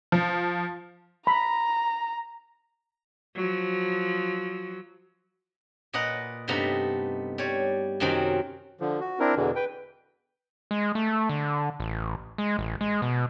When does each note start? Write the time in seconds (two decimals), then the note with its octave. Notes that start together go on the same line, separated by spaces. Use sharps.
0.12 F3
1.27 A#5 B5
3.36 F3 F#3
5.93 A#2 B4 D#5 F#5 A#5
6.48 G2 C3 A3 B3 D#4 A#5
7.38 G3 C#5
8.00 F#2 C3 D#3 F#3 C4 D#4
8.80 D3 F3
9.01 F#4
9.20 C4 D4 E4 A#4
9.35 E2 B2 D3 E3
9.56 B4 G5
10.71 G#3
10.95 A3
11.29 D3
11.80 A1
12.38 G#3
12.59 A1
12.81 G#3
13.02 B2